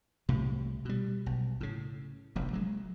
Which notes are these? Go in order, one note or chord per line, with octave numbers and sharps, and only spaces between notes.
C2 A2 C3
B2 G3
B1
A2 C#3
F1 A#1 F2
F#3 G#3